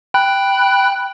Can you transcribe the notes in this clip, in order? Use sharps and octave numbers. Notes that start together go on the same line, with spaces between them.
G5 B5 F#6